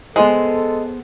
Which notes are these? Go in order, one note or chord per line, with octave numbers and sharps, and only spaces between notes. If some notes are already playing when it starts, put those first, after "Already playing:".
G#3 B3 G#4 A4 C5